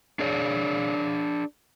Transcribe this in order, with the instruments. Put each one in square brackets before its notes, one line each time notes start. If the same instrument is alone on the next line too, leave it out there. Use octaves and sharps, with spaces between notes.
[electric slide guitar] D4 G#4 C#5 D5